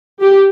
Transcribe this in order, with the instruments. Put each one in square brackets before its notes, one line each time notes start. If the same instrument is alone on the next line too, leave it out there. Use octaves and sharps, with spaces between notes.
[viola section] G4